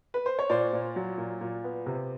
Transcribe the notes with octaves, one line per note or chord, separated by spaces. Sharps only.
B4
C5
C#5
A#2 C5 D5
A#2
F#3
A#2
A#2
B3
C3